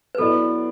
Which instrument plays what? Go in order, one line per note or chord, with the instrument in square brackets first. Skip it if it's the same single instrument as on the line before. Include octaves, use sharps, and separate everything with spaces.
[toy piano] B4
[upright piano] F#3 B3 E4 D5 [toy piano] A4